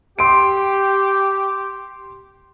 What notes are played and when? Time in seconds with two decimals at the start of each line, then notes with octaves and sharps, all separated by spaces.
0.19 G4 C6 D7